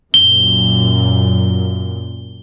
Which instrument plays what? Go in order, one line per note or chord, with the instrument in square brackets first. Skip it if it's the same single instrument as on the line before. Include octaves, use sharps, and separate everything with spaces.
[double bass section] F#2 A#2 [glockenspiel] G7